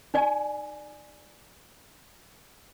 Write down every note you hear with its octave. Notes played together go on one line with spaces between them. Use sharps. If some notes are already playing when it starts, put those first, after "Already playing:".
D#4 D5 G#5